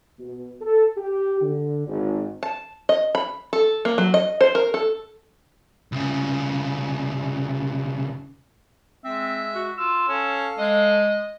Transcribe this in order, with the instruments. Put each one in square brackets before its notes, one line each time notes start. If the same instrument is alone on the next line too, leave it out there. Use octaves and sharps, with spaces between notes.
[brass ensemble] B2
A4
G4
D3
G#1
[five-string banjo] A5
D#5
B5
A4
A#3
F#3
D#5
C5
A#4
A4
[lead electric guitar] C2 C#3
[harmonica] G#3 E5 [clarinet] C4
[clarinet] F#4
[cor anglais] F4 [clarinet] E6
[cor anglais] C#4 [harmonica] A4 F5
[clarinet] G#3 [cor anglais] D#5